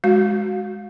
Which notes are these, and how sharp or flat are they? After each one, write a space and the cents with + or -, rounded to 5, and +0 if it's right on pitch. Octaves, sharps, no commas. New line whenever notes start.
G#3 +0 F#4 +10